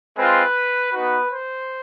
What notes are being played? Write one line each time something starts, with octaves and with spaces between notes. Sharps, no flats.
G#3 C4 F4 B4
B3 D#4 F#4 B4
C5